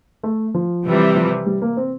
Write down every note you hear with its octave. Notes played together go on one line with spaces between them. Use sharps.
A3
F3
C3 E3 G3
F3
G3
A#3
C4